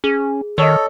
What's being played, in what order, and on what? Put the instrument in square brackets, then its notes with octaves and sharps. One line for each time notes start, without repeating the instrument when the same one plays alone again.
[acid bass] C#4 [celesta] G#4
[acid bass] D#3 [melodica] A4 [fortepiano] C#5 D#5